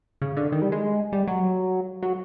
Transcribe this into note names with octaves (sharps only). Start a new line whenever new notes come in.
C#3
D3
D#3
G3
G#3
G3
F#3
F#3